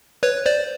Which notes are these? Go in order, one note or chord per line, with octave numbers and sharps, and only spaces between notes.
B4 C#5
C5 D5